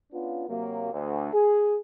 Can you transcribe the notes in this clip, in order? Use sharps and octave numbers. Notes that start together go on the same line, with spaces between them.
B3 C#4 D4 F4
C3 F#3 A#3
D2
G#4